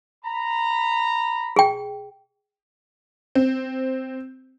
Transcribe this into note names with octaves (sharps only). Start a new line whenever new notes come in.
A#5 B5
G#4 G5
C4